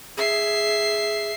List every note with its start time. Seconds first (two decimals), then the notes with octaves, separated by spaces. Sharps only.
0.17 G#4 E5 C7